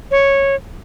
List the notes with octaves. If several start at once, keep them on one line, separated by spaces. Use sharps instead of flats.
C#5